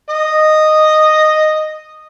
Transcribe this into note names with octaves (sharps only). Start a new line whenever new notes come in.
D#5 D#6